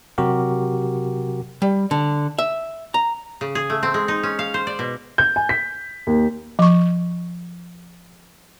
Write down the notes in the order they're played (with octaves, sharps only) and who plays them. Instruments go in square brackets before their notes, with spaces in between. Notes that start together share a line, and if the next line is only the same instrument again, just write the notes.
[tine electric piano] C3 F#3 F#4 G4 A#4
[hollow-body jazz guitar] G3
D3
E5
A#5
[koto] C#3
G#4
A3
C4
G#3
D#4
C#4
F5
C5
D5
B2
[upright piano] G6
G#5
B6
D#2
[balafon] F3 C#6